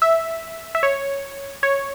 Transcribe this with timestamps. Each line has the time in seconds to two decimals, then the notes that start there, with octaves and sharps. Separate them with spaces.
0.02 E5
0.75 E5
0.83 C#5
1.63 C#5